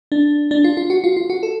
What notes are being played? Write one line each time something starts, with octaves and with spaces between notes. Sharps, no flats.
D4
D4
F4
F4
F#4
F4
F4
F#4
A4